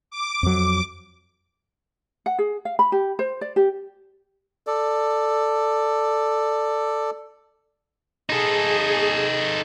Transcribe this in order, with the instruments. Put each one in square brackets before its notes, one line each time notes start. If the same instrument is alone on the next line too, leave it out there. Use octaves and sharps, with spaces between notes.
[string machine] D6
[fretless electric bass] F2 F#3
[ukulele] F#5
G#4
F5
B5
G4
C5
D5
G4
[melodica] A4 D5
[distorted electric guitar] D#4 A4 [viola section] G#4